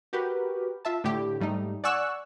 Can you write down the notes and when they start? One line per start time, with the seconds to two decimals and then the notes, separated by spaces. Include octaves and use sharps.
0.13 F#4 G4 A#4 B4
0.85 F4 E5 A5
1.04 A2 D3 A3 E4 G4
1.40 G#2 G3 A3 D#4
1.84 D5 F#5 G#5 C#6 E6 F#6